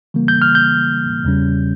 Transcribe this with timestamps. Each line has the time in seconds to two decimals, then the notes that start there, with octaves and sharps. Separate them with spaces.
0.14 C#3 E3 G3 A#3
0.28 G6
0.42 F6
0.55 G6
1.24 E2 C#3 G3 C#4